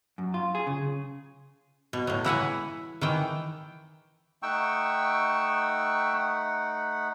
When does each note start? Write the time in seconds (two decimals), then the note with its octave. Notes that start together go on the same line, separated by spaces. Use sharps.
0.18 F#2
0.34 F4
0.55 G#4
0.67 C#3
1.93 B2
2.07 A2 F#3
2.24 E3 E4 F#5 G#5
3.01 D#3 E3 G5
4.43 A3 D#4 F#5 G5 C#6 E6